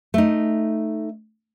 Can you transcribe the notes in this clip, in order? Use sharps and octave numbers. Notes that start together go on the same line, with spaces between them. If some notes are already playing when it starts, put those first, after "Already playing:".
A3 D#4